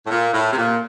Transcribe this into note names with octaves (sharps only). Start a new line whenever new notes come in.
A2
A#2
A2
C3
A#2